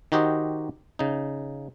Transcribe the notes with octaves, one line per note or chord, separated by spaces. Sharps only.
D#3 D#4 F#4 G4 C5 D#5
C#3 D#4